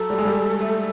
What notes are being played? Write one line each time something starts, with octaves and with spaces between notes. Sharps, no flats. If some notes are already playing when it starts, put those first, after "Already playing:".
Already playing: F#3 A4
G3
G#3
G3
A3